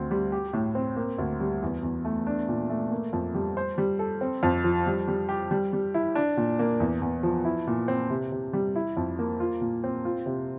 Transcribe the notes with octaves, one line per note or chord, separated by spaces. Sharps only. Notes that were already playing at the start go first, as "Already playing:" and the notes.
Already playing: D2 C4
G3
G4
A2
C4
A#3
D2
G3
E2
E2
A3
D4
A#2
A3
A#3
F2
G3
C5
G3
A4
C4
F2
F3
G3
G3
G4
G3
G3
E4
D4
A#2
A#3
E2
E2
F3
E4
A#2
C4
C3
C3
G3
E4
F2
A#3
F4
A#2
C4
F4
C3